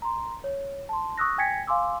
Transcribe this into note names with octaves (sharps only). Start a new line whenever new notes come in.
A#5 C6
C#5
A5 C6
C#6 D#6 E6 F#6 A#6
G5 G#5 G#6 A#6 B6 C#7
F5 G#5 C6 D6 E6